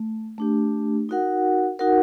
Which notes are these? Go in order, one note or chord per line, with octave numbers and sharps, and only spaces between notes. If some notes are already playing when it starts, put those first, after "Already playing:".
Already playing: A3
A3 D4 G4
D#4 F#4 A#4 F#5
D#4 F#4 A#4 F#5